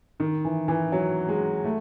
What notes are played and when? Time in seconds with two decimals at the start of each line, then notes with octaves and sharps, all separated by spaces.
0.20 D#3
0.45 E3
0.68 E3
0.92 F#3
1.28 G#3
1.64 A3